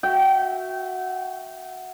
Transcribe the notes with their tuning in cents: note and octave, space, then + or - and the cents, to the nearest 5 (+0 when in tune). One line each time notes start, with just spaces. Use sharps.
F#4 +0 E5 +0 G5 -25